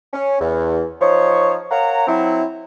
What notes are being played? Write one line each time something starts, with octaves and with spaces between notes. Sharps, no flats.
C#4
E2
F3 D#4 C5 C#5
A#4 C#5 F5 F#5 A#5
F#3 C4 E4